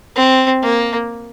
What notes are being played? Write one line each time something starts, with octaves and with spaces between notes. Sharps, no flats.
C4
A#3